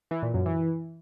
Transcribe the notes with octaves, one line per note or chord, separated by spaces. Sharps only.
E3
A#2
F#2
E3